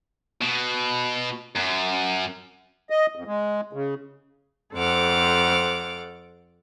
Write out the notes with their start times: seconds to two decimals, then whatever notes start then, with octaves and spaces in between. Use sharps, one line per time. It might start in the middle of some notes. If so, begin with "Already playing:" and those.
0.41 B2
1.55 F#2
2.90 D#5
3.16 F2
3.27 G#3
3.73 C#3
4.75 F2 A4 C5 F#5 D6 F6